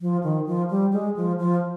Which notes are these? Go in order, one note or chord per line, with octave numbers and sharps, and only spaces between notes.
F3
D#3
F3
G3
G#3
F3
F3